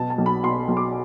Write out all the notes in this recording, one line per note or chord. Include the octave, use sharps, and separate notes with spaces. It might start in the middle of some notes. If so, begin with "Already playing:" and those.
Already playing: B2 F#3 A5
A5
B1
B5
B2 C6
B1
D6